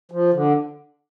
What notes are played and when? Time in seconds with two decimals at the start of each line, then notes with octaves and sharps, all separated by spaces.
0.11 F3
0.34 D3